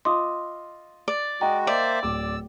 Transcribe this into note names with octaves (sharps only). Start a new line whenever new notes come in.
F4 D#5 C6 D6 D#6
D5
G#3 F#4 D#5 G5 A#5
A#3 C5 D5 E5
D1 D6 E6